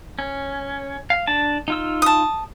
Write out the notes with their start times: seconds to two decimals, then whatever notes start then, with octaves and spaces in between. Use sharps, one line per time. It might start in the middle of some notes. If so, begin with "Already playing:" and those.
0.19 C#4
1.10 F5
1.27 D4 A5
1.68 D#4 F4 E6
2.02 A5 D#6